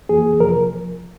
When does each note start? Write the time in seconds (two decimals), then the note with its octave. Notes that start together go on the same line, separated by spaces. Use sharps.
0.09 F2 E3 A#3 G#4
0.40 C3 F3 A#4